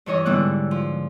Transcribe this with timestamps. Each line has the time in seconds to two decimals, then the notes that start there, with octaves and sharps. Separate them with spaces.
0.06 G2 E3 C#5 D#5
0.25 G#2 D3 G3 B3 E4 F#6
0.71 F3